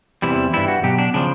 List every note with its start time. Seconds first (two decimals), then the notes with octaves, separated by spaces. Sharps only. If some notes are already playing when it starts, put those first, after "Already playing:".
0.22 E2 C3 E3 G3 E4
0.53 G2 E3 G3 E4
0.68 F#4
0.83 B2 F#3 G4
0.98 D4
1.14 C#3 F3 D4